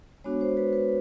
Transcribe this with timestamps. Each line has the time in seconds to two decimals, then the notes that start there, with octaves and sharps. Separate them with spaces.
0.24 G#3 B3 D4 F#4 C#5
0.41 C5
0.57 B4
0.73 B4